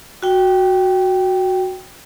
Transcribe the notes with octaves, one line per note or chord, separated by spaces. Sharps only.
F#4 G5